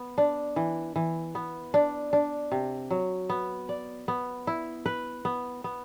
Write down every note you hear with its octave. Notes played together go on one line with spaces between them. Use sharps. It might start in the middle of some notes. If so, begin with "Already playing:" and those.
Already playing: B3
D4
E3
E3
B3
D4
D4
C3
F#3
B3
D5
B3
E4
B4
B3
B3